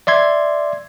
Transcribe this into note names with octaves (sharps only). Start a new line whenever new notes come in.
D5 E5 C6 G#6